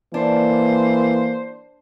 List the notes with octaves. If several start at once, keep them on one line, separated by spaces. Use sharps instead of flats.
E3 A#3 D4 C5